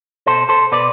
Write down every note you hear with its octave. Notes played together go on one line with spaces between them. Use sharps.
B2 A4 C5
A4 C5
B2 B4 D5